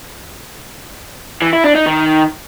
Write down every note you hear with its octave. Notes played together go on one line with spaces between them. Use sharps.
E3
E4
D4
D#4
D#3